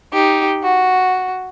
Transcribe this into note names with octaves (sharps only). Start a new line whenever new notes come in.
D#4 G4
F#4